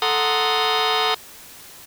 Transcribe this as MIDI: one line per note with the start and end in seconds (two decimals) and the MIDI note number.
0.02 1.14 69
0.02 1.14 78
0.02 1.14 82
0.02 1.14 84
0.02 1.14 87